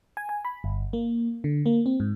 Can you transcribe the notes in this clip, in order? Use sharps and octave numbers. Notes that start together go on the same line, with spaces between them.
G#5
G#5
B5
G1
A#3
D3
A#3
C4
G#2